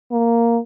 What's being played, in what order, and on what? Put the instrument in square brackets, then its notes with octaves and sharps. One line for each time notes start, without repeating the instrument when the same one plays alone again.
[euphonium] A#3